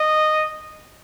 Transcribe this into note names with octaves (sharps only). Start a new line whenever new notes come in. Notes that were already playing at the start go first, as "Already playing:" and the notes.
Already playing: D#5